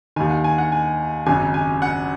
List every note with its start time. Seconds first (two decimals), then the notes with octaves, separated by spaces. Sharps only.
0.16 D#2 D#3 G#5
0.30 F#5
0.44 G#5
0.58 F#5
0.72 G#5
1.26 G#1 F#2 C#3 G#5
1.54 G#5
1.82 F#5